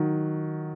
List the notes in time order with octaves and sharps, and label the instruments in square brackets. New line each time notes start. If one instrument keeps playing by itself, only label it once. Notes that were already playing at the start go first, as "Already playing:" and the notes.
Already playing: [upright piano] D#3 F#3